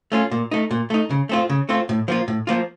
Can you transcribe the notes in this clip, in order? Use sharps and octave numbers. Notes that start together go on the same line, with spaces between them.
A3 C#4 F4
A#2
A3 D#4
A#2
A3 D#4
C#3
A3 C4 F4
C#3
A3 C4 F4
A2
F3 A#3 F4
A2
F3 A#3 F4